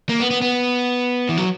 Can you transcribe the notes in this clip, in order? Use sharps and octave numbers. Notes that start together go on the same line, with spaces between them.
A#3
B3
B3
B3
E3
F#3